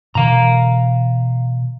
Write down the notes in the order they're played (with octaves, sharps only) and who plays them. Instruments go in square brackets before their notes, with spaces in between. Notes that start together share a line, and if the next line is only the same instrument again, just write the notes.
[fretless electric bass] B2 D3 E3 [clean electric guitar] F5 A#5